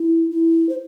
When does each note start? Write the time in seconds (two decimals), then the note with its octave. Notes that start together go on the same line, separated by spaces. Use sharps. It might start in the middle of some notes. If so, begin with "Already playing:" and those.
Already playing: E4
0.31 E4
0.69 C5